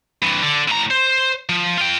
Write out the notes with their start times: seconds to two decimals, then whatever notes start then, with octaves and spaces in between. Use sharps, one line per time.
0.22 G2 E3
0.42 D3
0.68 A2 A#5
0.91 C5
1.49 F3
1.77 F4 G5